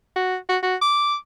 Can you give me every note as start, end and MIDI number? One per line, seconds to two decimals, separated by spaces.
0.16 0.37 66
0.49 0.58 66
0.63 0.76 66
0.81 1.15 86